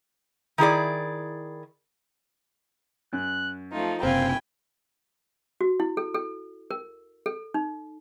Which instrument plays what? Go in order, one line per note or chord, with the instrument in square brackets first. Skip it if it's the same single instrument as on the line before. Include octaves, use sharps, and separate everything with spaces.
[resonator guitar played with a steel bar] D#3 E4 G#4 D5
[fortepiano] F#2 [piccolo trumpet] F#6
[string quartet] F3 A3 D#4 [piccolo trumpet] F4
[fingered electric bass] F#1 C3 [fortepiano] C4 [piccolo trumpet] F5 [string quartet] G5 G#5 B5
[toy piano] F#4
E4
A4
A4
A#4
A4
D#4